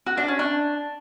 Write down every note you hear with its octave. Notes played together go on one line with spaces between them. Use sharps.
F#4
D4
C#4
D4